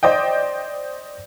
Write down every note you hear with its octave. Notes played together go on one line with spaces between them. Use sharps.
C5 D5 D#5 G5